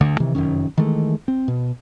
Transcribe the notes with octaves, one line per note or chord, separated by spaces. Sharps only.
D2 D3 A3
C3 D#3 E3
F1 F#2 D#3 C#4
D#3 E3 G#3 A3
C4
B2